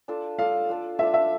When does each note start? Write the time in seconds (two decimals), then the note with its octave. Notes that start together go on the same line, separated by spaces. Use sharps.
0.08 D4 F4 A4
0.39 D4 F4 A4 F5
0.69 D4 F4 A4
0.99 D4 F4 A4 E5
1.14 E5